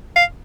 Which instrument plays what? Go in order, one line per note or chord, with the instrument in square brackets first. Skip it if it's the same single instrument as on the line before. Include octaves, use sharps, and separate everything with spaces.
[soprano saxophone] F5